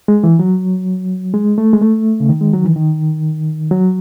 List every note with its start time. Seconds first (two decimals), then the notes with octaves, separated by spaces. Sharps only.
0.08 G#3
0.24 E3
0.39 F#3
1.34 G#3
1.58 A3
1.73 G#3
1.81 A3
2.20 C#3
2.29 D#3
2.41 G#3
2.53 F#3
2.64 E3
2.76 D#3
3.71 F#3